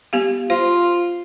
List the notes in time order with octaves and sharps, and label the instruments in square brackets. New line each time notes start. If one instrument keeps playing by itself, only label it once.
[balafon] B3 G4 F5
[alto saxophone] F4 [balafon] C5 F5